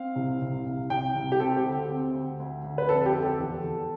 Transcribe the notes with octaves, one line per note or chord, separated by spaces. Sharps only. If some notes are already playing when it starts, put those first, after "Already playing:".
Already playing: C4 F5
C2
C2
C2
C2 G5
C2
G4
C4 A4
G4
D2
C4
D2
D2
D2
B4
F2 A4
A4
G4
F2
A4
E2
E2